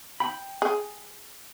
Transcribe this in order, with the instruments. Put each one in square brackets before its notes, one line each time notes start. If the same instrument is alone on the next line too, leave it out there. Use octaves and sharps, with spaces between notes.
[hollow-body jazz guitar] G5 B5
[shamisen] G#4